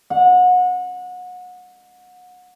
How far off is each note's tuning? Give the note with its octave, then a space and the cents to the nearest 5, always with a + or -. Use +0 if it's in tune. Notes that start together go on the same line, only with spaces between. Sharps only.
F#5 -30